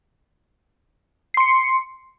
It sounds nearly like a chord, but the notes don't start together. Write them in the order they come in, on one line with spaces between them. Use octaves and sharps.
C7 C6 C#7